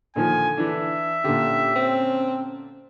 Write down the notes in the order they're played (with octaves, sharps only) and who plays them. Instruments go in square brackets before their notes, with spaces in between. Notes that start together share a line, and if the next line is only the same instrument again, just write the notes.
[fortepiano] A#2 D#3 F3 [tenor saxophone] D3 [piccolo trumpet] G#5
[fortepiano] E3 D4 [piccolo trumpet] E5
[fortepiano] A#2 D3 [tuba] C#4 [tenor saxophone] G4
[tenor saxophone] C4